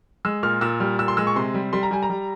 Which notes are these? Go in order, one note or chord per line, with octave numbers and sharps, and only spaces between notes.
G#3 E6
A#2 F6
A#2 E6
G3 F6
A#2 E6
C6
G#3 E6
C#6
C3 C6
G3
G3 C6
A#5
G3 G#5
A#5
G3